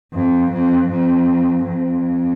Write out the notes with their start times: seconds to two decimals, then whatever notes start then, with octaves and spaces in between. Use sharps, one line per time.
0.14 F2
0.52 F2
0.91 F2
1.67 F2